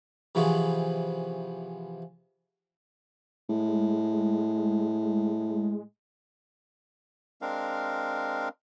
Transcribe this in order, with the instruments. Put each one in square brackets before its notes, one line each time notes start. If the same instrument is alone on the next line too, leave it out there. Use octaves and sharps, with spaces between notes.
[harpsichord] C3 E3 F3 F#4 G#4
[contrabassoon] A2 [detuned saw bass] G#3
[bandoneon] G#3 C4 D4 A#4 F5